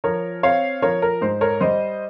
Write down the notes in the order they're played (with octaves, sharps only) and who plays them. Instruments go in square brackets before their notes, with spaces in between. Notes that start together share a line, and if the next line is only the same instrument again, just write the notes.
[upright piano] F3 A#4 C#5
C4 C#5 F5
F3 A#4 C#5
A#4
G#2 C5
A#4 C#5
G3 C5 D#5